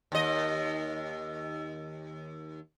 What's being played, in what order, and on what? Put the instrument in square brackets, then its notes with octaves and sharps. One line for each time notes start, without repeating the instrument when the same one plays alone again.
[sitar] D#2 D#5